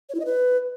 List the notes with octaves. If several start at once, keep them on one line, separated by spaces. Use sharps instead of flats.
C#5
E4
D#5
B4